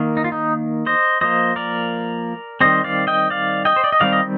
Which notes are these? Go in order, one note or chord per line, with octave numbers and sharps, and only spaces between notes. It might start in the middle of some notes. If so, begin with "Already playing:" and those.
Already playing: D#3 A#3
D#4
F4
D#4
C5 D#5
F3 A#3 C5 D#5
A#4 D5
D#3 G3 C4 C5 D#5
D5 F5
D#5 G5
D5 F5
D#5 G5
C5
D5
D#5
D#3 G3 C4 D5 F5
D#5